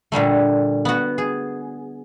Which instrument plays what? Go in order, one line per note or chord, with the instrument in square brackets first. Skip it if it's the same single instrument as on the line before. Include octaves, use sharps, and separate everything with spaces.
[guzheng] A#2 D3 G3 A3
B3 F#4
G#4